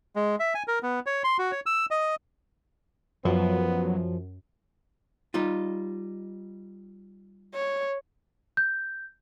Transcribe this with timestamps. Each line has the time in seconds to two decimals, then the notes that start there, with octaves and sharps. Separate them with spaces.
0.16 G#3
0.40 E5
0.55 G#5
0.68 A#4
0.83 B3
1.06 C#5
1.24 C6
1.38 F#4
1.52 C#5
1.66 E6
1.91 D#5
3.25 F#2 F3 F#3 B3
5.34 G3 D#4 F4
7.54 C#5
8.57 G6